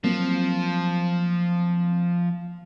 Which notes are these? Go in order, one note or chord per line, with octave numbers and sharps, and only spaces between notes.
F3 F#3 A#3 C4